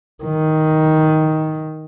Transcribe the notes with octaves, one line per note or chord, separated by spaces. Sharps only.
D#3